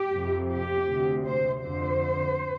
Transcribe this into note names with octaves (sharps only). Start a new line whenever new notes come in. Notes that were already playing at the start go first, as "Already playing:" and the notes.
Already playing: G4
F2 C3
G4
D2 C3
C5
F2 D3 C5